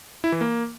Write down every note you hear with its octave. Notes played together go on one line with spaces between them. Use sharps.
E4
E3
A#3